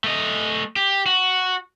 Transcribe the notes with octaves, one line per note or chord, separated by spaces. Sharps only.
A3 D#5
G4
F#4